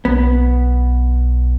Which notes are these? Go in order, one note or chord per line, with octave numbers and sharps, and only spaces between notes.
B1 B3